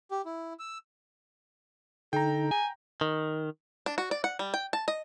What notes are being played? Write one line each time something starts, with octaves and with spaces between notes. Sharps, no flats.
G4
E4
E6
D3 D#4 A4 G5 A#5
G#5
D#3
D4
F#4
D5
F#5
G3
G5
A5
D#5